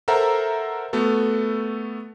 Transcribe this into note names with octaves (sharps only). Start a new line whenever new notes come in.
A4 A#4 C5 E5 F#5 A#5
A3 B3 F#4 A4